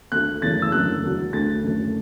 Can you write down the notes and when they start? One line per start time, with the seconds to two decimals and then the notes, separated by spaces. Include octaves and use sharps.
0.12 D2 D3 A3 F#6
0.42 F#1 E2 E3 A3 A6
0.62 E6
0.72 F#1 F#2 D3 F#3 A3 F#6
1.02 E2 D3 F#3 A3
1.32 D2 D3 A3 A6
1.64 F#1 F#2 D3 A3